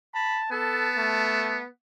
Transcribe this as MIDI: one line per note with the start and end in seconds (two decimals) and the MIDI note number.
0.14 0.49 81
0.14 0.40 83
0.52 1.68 59
0.52 0.88 69
0.52 1.60 81
0.97 1.62 57